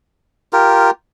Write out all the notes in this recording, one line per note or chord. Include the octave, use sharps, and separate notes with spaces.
F4 G4 A#4